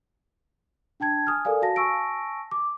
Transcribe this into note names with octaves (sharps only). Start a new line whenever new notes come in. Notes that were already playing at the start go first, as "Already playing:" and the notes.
D4 G5 A5 G#6
G#5 D#6 F6
A4 A#4 D5 F5 G#5
F#4 F5 A5 A#6
G#5 A5 C#6 E6 A#6 D7
D6